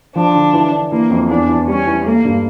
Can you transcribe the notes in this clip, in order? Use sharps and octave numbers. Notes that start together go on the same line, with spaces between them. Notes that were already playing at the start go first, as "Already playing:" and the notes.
F3 D4
D3
E3
D4
E3 A#3
F2
E2 D4
E3
G3 C#4
E3
A3 A#3
G2